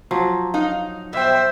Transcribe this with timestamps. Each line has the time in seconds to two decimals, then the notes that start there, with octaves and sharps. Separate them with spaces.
0.11 F3 F#3
0.54 D#4 F5
1.13 B2 C5 E5 G5